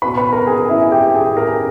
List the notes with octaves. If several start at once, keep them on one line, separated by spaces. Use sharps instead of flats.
B2 B4 B5
B4 B5
A#4 A#5
G#4 G#5
E4 E5
G4 G5
G#4 G#5
A#4 A#5